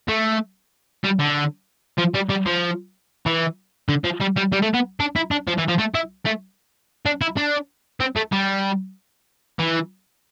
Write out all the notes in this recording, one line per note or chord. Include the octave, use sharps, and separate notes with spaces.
A3
G3
D3
F3
G3
G3
F3
E3
D3
F3
G3
G3
G3
A3
B3
D4
E4
D4
F3
E3
F3
A3
E4
A3
D4
E4
D4
C4
A3
G3
E3